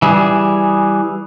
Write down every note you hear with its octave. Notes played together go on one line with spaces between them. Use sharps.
E3 G3 G#4